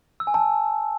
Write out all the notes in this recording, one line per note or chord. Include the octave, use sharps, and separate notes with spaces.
E6
G#5
A5